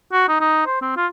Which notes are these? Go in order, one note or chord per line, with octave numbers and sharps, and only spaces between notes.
F#4
D#4
D#4
C5
C4
F4